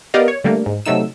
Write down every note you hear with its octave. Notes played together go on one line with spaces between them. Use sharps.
B3 G4 A#4 D5 D#5 F5
C#5
D3 G3 A3 A#3
G#2
C3 F#3 A3 D#4 E6